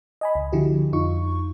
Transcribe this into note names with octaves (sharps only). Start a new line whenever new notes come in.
D#5 G#5 B5
C#2
D3 F3 E4 F#4 G4
F2 D#4 F4 C#6